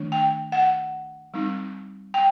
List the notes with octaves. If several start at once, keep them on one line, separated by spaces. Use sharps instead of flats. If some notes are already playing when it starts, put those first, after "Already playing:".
Already playing: D#3 A3 D4
G5
F#5
G3 C4 D#4
G5